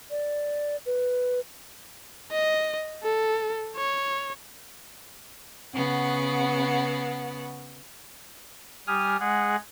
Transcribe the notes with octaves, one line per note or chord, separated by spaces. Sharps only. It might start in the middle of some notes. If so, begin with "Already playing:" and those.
D5
B4
D#5
A4
C#5
C#3 B3 F#5
G3 G4 G#5 D#6 F6
G#3 G#4 F#5